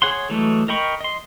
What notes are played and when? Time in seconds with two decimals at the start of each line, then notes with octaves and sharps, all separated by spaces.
0.02 G#4 C#5 F#5 C6
0.30 E3 F#3 G#3 A3
0.68 A#4 D#5 G5 B5 C#6
1.01 D#5 C6